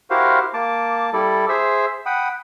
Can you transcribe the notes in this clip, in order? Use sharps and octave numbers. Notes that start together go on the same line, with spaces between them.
E4 F#4 G4 A#4 C5 F5
A#3 A5 D6
G3 E4 A4 D5
G#4 C5 E5 E6
F#5 G5 B5 D#6